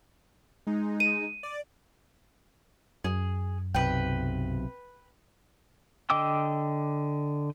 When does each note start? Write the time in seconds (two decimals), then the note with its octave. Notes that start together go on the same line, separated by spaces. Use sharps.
0.67 G#3 D#4
1.00 D#7
1.43 D5
3.04 F#2 G#4
3.74 B1 C3 B4 G5
6.10 D3 D#5 G5 D6 E6